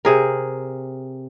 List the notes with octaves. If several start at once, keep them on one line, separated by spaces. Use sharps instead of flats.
C3 G#4 A#4